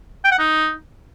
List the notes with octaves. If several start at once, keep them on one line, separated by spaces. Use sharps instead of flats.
G5
F#5
D#4